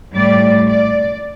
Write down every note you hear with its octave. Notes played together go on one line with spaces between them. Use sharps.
A2 G3 D5
D5